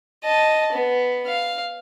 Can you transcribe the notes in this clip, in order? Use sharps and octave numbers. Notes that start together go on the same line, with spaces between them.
D#5 A5
B3
F5